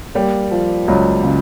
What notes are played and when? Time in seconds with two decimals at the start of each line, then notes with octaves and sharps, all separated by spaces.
0.15 G3 A#3
0.51 F3
0.88 C#2 F#3
1.24 C#3